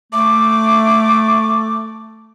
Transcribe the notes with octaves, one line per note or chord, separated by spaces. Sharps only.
A3 D6